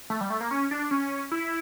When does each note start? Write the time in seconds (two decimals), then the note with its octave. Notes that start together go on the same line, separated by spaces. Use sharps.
0.10 A3
0.21 G3
0.30 A3
0.41 A#3
0.51 C#4
0.71 D4
0.91 C#4
1.32 E4